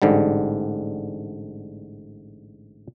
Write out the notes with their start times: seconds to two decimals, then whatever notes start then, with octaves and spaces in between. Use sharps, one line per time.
0.02 A1 G#2 D3 G3